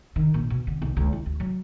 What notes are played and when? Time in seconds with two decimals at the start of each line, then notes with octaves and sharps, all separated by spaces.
0.16 D#3
0.34 A#1
0.50 B2
0.67 D3
0.82 B1
0.97 C#2
1.13 E4
1.26 D2
1.40 F#3